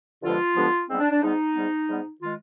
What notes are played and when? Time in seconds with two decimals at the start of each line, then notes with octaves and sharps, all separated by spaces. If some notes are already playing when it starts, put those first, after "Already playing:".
0.22 G2 D3 F3 G#3 B3 F4
0.56 G2 D3 F3 G#3 B3
0.89 G#2 G3 B3 C4
0.99 D4
1.11 D4
1.21 G#2 G3 B3 D#4
1.54 G#2 G3 B3
1.87 G#2 G3 B3
2.20 D#3 G#3 F4